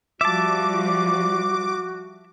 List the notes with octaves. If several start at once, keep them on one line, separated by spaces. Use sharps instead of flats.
F3 G3 F#4 E5 A5 D6